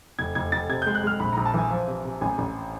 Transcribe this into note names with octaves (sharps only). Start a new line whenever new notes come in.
F1 G#6
F1 G#6
F1 A6
C3 G#6
G#3 G6
F#6
G#3 F6
A#1 B5
A#1 A#5
A5
E3 G#5
F3
C3
C3
A1 G#5
A1